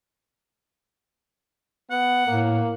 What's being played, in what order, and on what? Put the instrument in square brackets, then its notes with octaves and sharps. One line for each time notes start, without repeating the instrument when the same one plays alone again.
[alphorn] B3 [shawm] F#5
[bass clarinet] A2 [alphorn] A#3